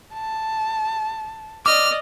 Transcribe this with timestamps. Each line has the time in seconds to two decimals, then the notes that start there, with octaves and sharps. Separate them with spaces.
0.14 A5
1.66 D5 D#5 D6 F6